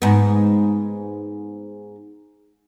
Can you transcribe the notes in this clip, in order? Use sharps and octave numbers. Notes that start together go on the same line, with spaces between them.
G#2 B3